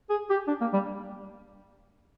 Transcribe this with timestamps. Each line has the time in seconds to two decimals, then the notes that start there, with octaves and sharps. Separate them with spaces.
0.09 G#4
0.30 G4
0.47 D4
0.61 A#3
0.73 G3